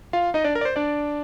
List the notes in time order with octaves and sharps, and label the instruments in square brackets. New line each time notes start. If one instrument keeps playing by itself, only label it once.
[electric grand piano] F4 F5
D#4 D#5
D4 D5
A#4
D5
C5
D4 D5